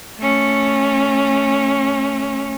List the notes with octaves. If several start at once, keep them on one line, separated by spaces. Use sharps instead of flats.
A3 C#4